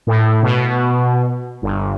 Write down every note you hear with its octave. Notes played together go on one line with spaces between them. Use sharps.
A2
B2
G1